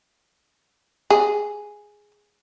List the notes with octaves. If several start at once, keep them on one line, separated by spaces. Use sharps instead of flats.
G#4